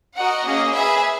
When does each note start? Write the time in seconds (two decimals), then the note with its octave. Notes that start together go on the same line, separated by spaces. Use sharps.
0.17 F#4 A#4 D#5 F#5
0.45 A#3 C#4 G#4 D#5
0.74 G#4 B4 E5 G#5